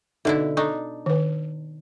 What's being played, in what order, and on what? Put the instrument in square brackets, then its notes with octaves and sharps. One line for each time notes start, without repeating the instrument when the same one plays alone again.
[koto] B2 D3 E4 [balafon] D#4 A4 E5
[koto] D4 D#4 [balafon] A4 C#6
[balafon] D#3 B4